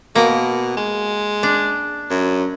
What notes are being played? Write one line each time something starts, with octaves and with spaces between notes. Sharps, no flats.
B2 A#3
G#3
D4
F#2